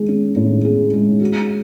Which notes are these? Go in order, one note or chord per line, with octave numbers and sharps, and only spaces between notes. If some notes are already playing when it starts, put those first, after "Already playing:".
Already playing: G#3 G#4
C#4
A2
G#4
G#3
F#4